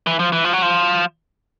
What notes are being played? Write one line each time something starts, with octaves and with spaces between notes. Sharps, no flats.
E3
F3
E3
F3
F#3
F3